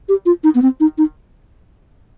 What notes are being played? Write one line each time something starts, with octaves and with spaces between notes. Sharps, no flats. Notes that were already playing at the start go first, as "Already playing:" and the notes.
G4
F4
D#4
B3
C4
D#4
D#4